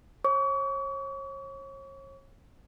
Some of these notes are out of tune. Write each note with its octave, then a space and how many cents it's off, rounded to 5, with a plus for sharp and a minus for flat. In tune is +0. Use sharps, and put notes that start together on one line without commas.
C#5 -40 C#6 +40